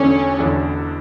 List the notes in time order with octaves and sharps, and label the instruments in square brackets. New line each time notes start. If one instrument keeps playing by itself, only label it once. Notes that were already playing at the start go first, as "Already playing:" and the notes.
Already playing: [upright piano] E1 E2 D3 A3 D4 [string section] C#4
[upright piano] E1 E2 D3 A3 D4